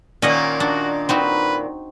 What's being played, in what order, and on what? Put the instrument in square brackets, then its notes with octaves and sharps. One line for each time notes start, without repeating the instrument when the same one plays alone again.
[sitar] A#2 D#3 A#3 [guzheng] C#4 D#5 F#5
[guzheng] D4 [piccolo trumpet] F#4
[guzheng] C4 D#4 F#4 [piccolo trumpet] B4